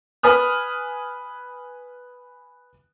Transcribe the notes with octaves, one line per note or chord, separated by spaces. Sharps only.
B4 G#5 D#6 F6